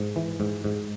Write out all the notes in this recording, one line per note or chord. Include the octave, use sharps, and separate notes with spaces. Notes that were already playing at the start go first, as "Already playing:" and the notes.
Already playing: G#2
E3
G#2
G#2